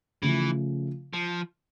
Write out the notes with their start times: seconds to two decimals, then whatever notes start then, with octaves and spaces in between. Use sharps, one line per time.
0.23 C#3 E3 F3 A3
1.13 F3